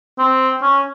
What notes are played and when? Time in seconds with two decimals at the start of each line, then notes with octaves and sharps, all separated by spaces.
0.18 C4
0.62 C#4